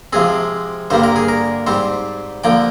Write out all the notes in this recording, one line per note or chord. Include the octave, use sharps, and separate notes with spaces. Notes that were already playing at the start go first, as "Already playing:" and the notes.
C3 F3 G#3 C4 G#4
G2 D3 G3 A#3 C5
A#4
G#4
A#4
G#2 G3 C4 C5
D3 F3 A#3 G5